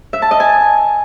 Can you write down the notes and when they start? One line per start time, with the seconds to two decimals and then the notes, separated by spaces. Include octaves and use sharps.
0.13 E5
0.22 A5
0.31 D#5
0.40 G#5